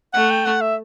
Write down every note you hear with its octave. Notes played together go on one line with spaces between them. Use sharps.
A3 F#5
G5
F#5
E5